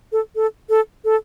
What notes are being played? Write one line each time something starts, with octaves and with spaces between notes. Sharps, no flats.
A4
A4
A4
A4